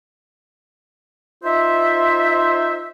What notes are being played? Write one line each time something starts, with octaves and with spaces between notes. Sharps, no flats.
D#4 F4 C5 E5